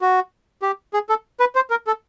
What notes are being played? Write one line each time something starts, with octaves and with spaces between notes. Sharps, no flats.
F#4
G4
G#4
A4
B4
C5
A#4
A4